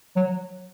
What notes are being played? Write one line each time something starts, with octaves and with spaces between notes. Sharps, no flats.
F#3